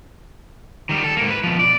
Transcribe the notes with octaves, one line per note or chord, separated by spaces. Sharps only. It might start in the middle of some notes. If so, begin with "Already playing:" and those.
D#3 G3
A4
G#2 A#3
B4
B2 F3
D5